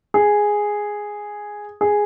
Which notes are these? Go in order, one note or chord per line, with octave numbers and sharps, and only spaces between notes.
G#4
G#4